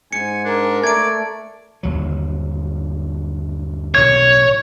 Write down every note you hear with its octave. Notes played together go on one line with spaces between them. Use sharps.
G#2 G#5 C#7
D4 A#4
A3 D5 G#6 D7
G1 D#2 F#3
B1 A2 D#3 C#5 G#6